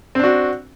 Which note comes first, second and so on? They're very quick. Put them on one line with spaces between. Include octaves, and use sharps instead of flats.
C4 D4 F#4